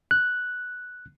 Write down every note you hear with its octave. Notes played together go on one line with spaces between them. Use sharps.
F#6